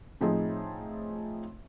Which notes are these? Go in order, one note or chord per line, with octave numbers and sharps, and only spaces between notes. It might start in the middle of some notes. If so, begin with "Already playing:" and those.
A2 F3 C4 D#4 G#4